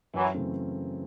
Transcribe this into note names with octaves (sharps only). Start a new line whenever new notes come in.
F#2 E3 F#3
C#3 E3 A3 C4